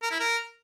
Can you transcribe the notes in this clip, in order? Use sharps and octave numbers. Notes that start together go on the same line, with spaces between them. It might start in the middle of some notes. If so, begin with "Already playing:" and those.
A#4
E4
A#4